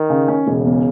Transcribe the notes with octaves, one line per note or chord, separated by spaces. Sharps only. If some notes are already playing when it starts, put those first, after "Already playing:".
Already playing: D#3
C#3
C#4
E1 C#3
E2